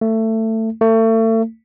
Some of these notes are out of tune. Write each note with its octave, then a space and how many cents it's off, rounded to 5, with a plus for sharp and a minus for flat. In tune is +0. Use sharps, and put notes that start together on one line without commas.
A3 +20
A3 +35